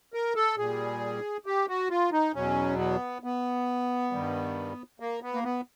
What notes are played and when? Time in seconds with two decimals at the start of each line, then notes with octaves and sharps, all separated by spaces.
0.14 A#4
0.36 A4
0.58 A#2 G3 G#4
1.46 G4
1.69 F#4
1.90 F4
2.12 D#4
2.35 E2 B2 F#3 C#4
2.78 B3
3.23 B3
4.11 G2 D#3 G3
5.00 A#3
5.22 B3
5.34 A#3
5.44 B3